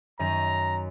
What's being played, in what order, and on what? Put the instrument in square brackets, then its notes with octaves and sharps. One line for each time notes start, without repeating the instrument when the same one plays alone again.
[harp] F#2 D#3 D#7 [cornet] A#5